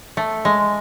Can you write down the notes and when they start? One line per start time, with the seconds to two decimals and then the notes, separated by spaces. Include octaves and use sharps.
0.17 A3
0.45 G#3